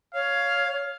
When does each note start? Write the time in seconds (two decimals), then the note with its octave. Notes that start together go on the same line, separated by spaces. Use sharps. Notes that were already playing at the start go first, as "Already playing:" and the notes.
0.15 C#5 F5